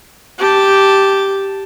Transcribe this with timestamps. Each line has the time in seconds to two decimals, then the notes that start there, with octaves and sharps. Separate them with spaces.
0.39 G4 A5